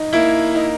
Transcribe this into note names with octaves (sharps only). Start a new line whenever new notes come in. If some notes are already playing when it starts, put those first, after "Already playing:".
Already playing: D#4
A#3 E4 E5
D#4